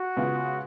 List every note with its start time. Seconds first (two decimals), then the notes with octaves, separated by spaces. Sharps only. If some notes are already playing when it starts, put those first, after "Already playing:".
Already playing: F#4
0.16 C#3 G#3 B3 F4 B4